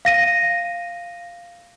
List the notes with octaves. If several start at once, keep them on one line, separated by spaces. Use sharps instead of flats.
F5 A#6 D#7